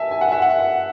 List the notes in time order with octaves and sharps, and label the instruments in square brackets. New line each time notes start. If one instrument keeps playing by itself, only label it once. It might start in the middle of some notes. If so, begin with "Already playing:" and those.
Already playing: [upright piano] E5 G#5 A5
G#5
F#5
E5
F#5